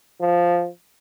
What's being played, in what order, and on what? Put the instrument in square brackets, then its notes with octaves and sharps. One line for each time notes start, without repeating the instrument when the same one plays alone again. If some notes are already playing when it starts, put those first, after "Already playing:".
[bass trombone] F3